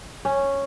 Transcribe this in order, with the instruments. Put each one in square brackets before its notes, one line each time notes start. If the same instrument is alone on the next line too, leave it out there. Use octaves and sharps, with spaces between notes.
[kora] C#4